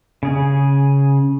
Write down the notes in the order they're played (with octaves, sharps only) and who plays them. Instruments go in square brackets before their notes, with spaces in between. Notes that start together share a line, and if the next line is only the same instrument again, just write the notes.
[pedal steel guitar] C#3 G#4